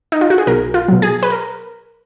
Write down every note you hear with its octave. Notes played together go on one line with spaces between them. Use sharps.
D#4
F4
F#4
G#4
B1 A#4
F4
B2 F#3
G#4
B4
A#4